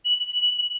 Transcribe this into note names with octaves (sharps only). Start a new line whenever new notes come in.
F#7